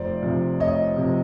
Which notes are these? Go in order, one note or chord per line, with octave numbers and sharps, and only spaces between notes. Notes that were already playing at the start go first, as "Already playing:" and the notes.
Already playing: F1 C5 D5
F2 C3
F1 C#5 D#5
F2 C3